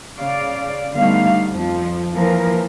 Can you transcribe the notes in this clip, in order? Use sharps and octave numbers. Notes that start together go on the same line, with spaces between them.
C#3 D5 F5
D3 G3 A3 B3 D#4 F5
F2 F3
E3 F3 A#3 A#4